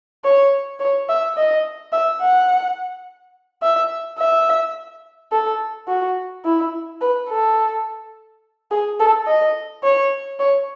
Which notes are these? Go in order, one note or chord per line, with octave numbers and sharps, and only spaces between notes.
C#5
C#5
E5
D#5
E5
F#5
E5
E5
A4
F#4
E4
B4
A4
G#4
A4
D#5
C#5
C#5